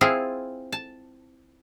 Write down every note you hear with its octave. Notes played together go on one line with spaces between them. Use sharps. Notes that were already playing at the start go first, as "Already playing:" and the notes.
C4 E4 F4 G#4
A5